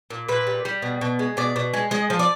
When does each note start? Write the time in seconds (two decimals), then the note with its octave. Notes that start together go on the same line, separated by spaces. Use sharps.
0.10 A#2
0.28 A#2 B4
0.47 G3
0.65 G3
0.82 B2
1.01 B2
1.19 G#3
1.37 B2 D5
1.56 B2
1.74 G#3
1.91 G#3 D#5
2.10 F3
2.19 D5